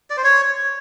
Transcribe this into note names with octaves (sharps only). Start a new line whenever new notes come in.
D5
C5
C#5